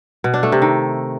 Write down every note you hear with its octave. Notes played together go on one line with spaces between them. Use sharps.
B2
D4
A3
C3
D#3